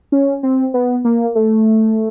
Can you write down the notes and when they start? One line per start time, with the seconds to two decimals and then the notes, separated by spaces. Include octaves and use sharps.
0.12 C#4
0.43 C4
0.74 B3
1.05 A#3
1.35 A3